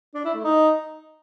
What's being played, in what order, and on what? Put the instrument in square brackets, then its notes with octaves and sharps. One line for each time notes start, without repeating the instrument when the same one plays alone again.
[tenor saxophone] D4
E4
A3
D#4